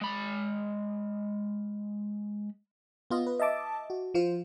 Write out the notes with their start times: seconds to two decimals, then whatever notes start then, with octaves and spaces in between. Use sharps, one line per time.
0.01 G#3 B5
3.10 B3 F4 D#5
3.27 B4
3.39 D#5 E5 A5 D6
3.90 F#4
4.14 F3 F4 C5